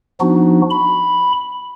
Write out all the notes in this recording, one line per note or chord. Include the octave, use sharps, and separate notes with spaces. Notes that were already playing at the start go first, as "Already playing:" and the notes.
F3 B3 D4 D#4 F#4
B5